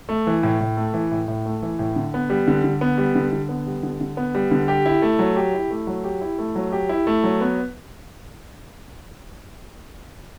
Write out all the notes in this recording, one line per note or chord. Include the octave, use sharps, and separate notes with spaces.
A3
E3
A2
A2
A3
E3
A2
A2
A3
E3
A2
D3
B3
G3
D3
D3
B3
G3
D3
D3
B3
G3
D3
D3
B3
G3
D3
G4
E4
A3
F#3
G4
E4
A3
F#3
G4
E4
A3
F#3
G4
E4
A3
F#3
B3